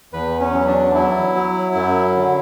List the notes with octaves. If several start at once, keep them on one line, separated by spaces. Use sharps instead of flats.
E2 B4
C#4
F#3
D4
F#3 E4
F#3
F#2
D3